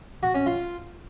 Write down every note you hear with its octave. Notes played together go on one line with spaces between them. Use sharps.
F#4
C#4
F4